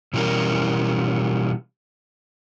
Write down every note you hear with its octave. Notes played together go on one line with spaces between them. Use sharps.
B2 E3 G3 C#4 A#4